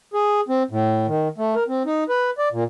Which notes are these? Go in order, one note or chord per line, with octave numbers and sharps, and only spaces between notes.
G#4
C4
A2
D#3
A3
A#4
C4
D#4
B4
D5
A#2